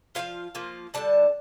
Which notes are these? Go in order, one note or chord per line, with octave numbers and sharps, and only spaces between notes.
F3 A#3 F4 F5
F3 A#3 F4
D3 G3 D4 A5